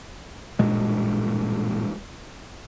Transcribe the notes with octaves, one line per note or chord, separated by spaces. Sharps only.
A1 G2 A#2 G#3